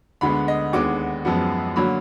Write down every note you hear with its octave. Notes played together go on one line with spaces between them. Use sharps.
D2 D3 G#3 B3 B5
D#5
D#2 D3 G#3 B3 D6
F#2 F3 G#3 B3
D3 F#3 A#3 B5